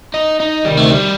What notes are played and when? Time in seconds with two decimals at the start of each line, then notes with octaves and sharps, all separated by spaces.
0.14 D#4
0.40 D#4
0.65 D2 C3 D#3 G3
0.77 A3
0.91 G3